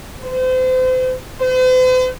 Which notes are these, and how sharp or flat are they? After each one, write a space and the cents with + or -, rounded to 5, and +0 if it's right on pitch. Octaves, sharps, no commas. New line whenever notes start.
C5 -35
C5 -45